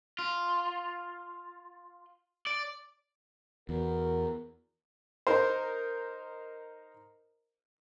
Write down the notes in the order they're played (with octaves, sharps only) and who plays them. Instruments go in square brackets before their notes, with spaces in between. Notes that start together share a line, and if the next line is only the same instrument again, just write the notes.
[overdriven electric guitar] F4
D5
[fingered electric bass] E2 [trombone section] F#4 A#4
[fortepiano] D#4 A#4 C5